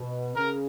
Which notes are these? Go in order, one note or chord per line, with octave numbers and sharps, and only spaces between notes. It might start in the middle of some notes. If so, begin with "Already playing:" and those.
Already playing: B2
C#3 A#4